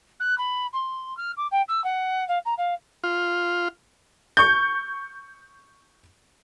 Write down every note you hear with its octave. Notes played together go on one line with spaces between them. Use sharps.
F#6
B5
C6
F6
D6
G5
E6
F#5
F5
A#5
F5
F4
C#6 G6